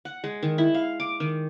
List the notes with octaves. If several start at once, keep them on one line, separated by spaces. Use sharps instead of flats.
F#5
G#3
D#3
E4
F5
D6
D#3